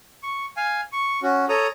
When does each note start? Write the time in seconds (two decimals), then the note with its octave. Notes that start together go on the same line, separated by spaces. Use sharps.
0.23 C#6
0.57 F5 G#5
0.92 C#6
1.23 C#4 F#4
1.49 A4 C#5 A#5 D#6